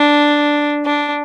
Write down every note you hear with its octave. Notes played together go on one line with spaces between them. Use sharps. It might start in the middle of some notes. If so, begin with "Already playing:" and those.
Already playing: D4
D4